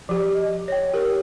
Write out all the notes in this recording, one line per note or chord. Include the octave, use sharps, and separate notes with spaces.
F3 G4
D#5
C#5 G5
G4 A#4